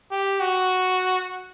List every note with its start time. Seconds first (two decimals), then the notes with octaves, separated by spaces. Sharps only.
0.11 G4
0.40 F#4